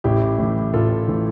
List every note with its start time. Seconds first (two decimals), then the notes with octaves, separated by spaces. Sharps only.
0.04 A1 E4 G4
0.38 A2 E3
0.73 A1 F4 A4
1.08 A2 E3